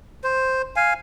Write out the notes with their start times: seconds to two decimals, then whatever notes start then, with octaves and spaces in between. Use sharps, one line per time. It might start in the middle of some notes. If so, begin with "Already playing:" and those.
0.24 C5
0.76 F5 G#5